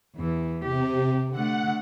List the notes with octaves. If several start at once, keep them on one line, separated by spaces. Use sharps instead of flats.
E2 E3
C3 G4
D3 A3 F#5